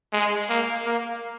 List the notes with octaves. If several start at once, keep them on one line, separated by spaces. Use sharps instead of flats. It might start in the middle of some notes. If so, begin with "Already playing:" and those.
G#3
A#3
A#3